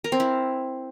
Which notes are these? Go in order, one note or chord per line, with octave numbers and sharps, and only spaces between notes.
A#4
C4
E4